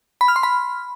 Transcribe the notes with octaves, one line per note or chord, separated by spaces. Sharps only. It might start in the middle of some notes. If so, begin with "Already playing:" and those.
B5
F6
C6
B5